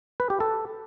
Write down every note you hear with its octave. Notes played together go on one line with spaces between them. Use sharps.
B4
G4
A4